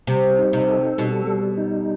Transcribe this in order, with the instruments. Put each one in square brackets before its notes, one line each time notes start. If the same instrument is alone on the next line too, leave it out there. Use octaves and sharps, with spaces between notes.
[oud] C3 [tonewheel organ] G3
[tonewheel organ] D#4
[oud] C3
[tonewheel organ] A4
[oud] B2 [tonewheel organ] G3
[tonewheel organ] G3
D#4